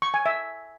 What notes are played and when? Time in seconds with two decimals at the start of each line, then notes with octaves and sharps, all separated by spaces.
0.02 C#6
0.14 G#5
0.26 E5